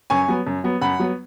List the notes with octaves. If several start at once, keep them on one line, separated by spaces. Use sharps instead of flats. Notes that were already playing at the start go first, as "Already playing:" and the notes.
F#2 G#5 C#6
F#3 B3
F#2
F#3 B3
F#2 F#5 B5
F#3 B3